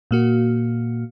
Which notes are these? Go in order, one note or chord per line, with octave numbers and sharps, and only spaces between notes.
A#2 A#3 F#4